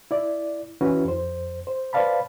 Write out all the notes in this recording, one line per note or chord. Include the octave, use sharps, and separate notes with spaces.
E4 D5
E3 C#4 E4 F#4 B4
F2 C5
C5
B4 C5 D5 F5 A5 B5